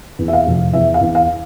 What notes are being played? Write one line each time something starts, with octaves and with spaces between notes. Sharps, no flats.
E2
E5
F5
F1
E2 E5
F5
E2
F5